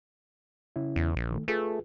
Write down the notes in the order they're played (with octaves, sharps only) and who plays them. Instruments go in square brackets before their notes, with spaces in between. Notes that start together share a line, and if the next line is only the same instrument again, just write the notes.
[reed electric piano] C#3 C#4 E4
[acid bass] E2
A#1
[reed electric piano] D#3 A3
[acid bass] A3 [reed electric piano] F4 G#4 B4